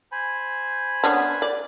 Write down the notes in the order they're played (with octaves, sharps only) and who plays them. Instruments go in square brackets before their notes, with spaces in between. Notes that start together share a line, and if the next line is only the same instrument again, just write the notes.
[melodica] C5 G#5 B5
[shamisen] B3 C#4 D4
D5